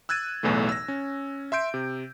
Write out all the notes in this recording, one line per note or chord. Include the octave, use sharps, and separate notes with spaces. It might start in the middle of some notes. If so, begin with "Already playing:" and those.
E6 F#6 G#6 A6 D#7
B1 E2 A2 E3 A3
E6 A#6
C#4
E5 C6 G6 D7
C3